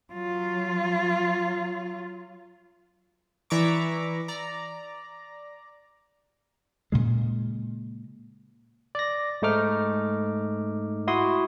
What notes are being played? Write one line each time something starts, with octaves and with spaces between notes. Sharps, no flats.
F#3 F4
E3 D5 E5 A#5 C#6 D6
D5 A#5
A#2 C#3 G#3
D5 A#6
G#2 A3 D#4 D6 F6
E4 F#4 C6 D#6